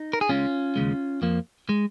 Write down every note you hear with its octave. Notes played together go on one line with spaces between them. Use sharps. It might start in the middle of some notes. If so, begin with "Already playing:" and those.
Already playing: D#4
A#4
G#4
C#2 C#3 G#3 C#4 F4
D#2 C#3 G#3
F2 F3 A#3
G#3